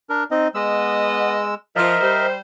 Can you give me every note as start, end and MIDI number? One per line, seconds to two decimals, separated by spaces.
0.10 0.24 62
0.10 0.24 70
0.31 0.48 60
0.31 0.48 63
0.31 0.48 75
0.55 1.55 56
0.55 1.52 59
0.55 1.52 75
0.55 1.55 88
1.76 1.96 53
1.76 2.27 70
1.76 2.27 75
1.76 2.27 76
2.00 2.38 55
2.00 2.38 72